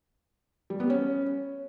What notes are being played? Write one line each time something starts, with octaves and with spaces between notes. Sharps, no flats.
G3
B3
C#4